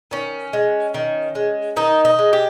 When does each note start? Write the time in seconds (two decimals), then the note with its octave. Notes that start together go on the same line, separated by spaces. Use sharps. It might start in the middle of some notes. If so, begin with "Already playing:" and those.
0.11 D#3 C#4
0.53 G#3
0.94 D#3
1.35 G#3
1.76 D#3 D#4
2.05 D#4
2.19 G#3
2.33 G4